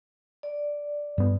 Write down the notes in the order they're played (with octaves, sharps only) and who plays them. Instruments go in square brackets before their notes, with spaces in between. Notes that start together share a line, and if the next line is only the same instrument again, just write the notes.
[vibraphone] D5
[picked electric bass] G2 B3